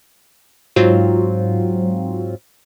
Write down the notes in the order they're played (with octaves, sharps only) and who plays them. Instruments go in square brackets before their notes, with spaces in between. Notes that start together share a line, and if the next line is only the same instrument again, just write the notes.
[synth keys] G#2 F#3 C4 F4